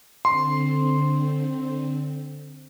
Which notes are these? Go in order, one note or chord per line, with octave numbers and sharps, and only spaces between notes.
D3 C4 C6